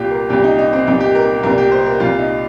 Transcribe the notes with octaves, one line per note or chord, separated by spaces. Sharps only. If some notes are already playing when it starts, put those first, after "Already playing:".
Already playing: C2 A#2 F4 G4
A#4
C2 A#2 G4
D#4
D#4
C4
C2 A#2 D#4
G4
A#4
C2 A#2 A#4
G4
C5
A#4
C2 A#2 F4
D#4